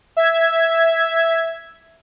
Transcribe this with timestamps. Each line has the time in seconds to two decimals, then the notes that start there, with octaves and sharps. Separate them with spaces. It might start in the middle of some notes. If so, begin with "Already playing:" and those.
0.17 E5 G#6